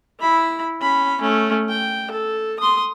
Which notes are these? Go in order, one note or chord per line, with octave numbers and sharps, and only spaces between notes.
E4 B5
C#4 B5
A3 C#4
G5
A4
C6 D#6